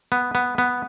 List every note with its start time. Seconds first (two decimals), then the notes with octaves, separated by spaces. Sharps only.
0.12 B3
0.35 B3
0.58 B3